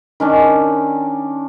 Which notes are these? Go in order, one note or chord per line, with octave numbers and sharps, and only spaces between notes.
D#3 C#4 D4